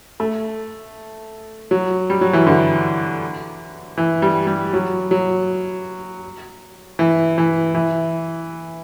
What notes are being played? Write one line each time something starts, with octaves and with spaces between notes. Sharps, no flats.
A3
F#3
G3
F#3
E3
D3
E3
G3
G3
F#3
F#3
E3
E3
E3